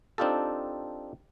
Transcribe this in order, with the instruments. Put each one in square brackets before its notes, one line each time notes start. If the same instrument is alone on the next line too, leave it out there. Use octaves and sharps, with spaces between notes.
[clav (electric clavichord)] C4 D4 D#4 F4 G4 A4